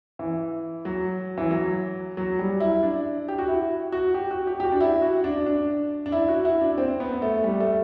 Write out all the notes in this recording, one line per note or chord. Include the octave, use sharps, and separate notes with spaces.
E3
F#3
E3
F#3
F#3
G3
E4
D4
G4
F#4
E4
F#4
G4
F#4
G4
G4
F#4
D4
E4
F#4
D4
D4
D4
E4
F#4
E4
D4
C4
B3
A3
G3
A3